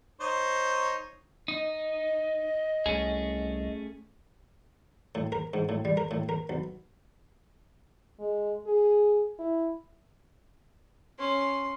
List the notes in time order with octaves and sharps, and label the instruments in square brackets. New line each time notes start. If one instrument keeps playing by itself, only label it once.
[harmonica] D#4 C5 C#5
[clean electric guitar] D#4 [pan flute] D#5
[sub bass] C2 [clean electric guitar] A3 C#4 G#4
[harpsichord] A2
A#4
G#2
A2
G3
A#4
A2
A#4
B1
[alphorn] G#3
G#4
E4
[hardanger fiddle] C#4 C6